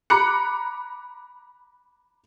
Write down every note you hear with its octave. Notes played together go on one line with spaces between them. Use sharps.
A#5 B5 D6 F#6 C#7